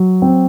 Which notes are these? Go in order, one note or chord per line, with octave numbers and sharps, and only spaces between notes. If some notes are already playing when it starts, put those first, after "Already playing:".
Already playing: F#3
C4